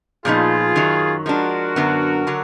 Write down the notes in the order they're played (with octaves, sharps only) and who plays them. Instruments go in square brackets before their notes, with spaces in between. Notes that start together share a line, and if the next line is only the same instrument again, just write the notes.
[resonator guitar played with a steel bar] A#2 F3 B3 D#4 [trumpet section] F4 G#4
[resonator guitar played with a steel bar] F#2 D#3 F#3
[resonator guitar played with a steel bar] F3 G#3 D4 [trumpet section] F#4 A#4
[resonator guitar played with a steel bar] F#2 D3 F#3 B3 D4
D3 F#3